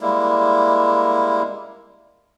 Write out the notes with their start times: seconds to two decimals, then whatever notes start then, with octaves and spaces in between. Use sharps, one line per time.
0.01 G3 G#3 A#3 E4